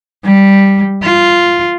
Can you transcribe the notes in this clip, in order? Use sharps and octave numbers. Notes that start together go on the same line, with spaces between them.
G3
F4